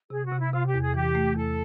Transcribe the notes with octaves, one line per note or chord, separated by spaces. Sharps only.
C3 G#4
F#4
C3
E4
C3 F4
G4
E2
G#4
E3 G4
A3
E2 A4